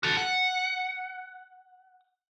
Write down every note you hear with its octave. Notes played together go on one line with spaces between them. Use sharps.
F#4 A4
F#5